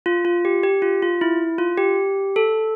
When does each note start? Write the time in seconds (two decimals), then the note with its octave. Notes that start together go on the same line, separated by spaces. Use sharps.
0.06 F4
0.25 F4
0.45 G4
0.63 G4
0.82 F4
1.02 F4
1.21 E4
1.58 F4
1.78 G4
2.36 A4